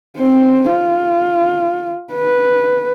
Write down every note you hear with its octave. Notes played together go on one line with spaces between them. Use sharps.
C4 C5
F4
B4